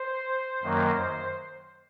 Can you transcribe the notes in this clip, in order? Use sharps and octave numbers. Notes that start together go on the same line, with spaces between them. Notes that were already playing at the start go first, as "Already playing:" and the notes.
Already playing: C5
F#2 D#3 F#3 A#3